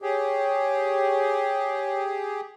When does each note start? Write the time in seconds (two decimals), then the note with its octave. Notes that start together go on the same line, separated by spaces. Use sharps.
0.02 G4 G#4 C#5